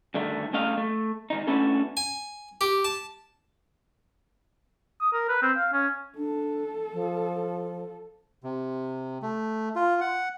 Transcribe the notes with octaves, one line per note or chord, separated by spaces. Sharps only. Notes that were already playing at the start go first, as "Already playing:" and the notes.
G2 D3 D#3 A3
C#3 A3 D#5 F5
A3
G#2 D#3 D#4
A3 B3 C#4 D4 E4 A4
G#5
G4
A5
D#6
A#4
B4
C4
F5
C#4
D4 A4
F3
C3
A3
F4
F#5